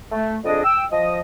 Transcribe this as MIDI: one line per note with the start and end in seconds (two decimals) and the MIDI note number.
0.12 0.36 57
0.45 0.60 41
0.45 0.60 62
0.45 0.60 68
0.45 0.60 74
0.45 0.60 75
0.64 0.83 79
0.64 0.83 88
0.92 1.20 53
0.92 1.20 75